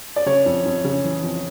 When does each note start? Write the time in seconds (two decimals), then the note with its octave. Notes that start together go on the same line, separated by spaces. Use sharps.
0.16 D5
0.26 C#3 C#5
0.46 F2
0.65 F2
0.84 C#3
1.04 E3
1.23 F2